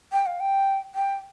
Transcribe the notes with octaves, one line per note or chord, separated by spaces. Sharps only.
G5
F5
G5
G5